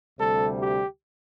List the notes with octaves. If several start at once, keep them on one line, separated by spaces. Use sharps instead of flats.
D2 C3 G3 A4
G4